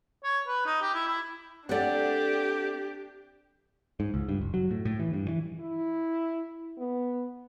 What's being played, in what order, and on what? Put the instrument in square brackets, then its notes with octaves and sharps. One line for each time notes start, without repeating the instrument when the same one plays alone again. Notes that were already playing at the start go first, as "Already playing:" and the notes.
[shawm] C#5
B4
D#4
G4
E4
E4
[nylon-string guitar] A3 C4 [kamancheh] D4 G4 [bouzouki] D5 F#5
[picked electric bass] G#2
C#2
G2
F#1
F#3
A2
A2
E3
G2
E3
[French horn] E4
B3